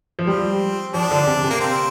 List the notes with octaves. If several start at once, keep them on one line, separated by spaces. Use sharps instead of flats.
F3
G3 C4
F3 D4
D3
C3
C3
A#3
C4